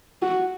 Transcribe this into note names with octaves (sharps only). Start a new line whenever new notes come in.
F#4